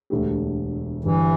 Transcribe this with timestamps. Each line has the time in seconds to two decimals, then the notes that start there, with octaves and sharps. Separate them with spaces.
0.10 E1 D2 D3 A3 G4
1.04 G1 G2 E3 G3 E4 G4